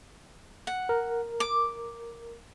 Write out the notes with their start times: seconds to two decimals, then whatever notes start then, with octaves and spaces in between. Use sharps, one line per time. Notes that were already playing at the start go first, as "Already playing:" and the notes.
0.67 F#5
0.89 A#4
1.40 D6